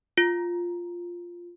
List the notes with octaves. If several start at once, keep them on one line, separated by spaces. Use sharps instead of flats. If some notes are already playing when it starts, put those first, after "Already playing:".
F4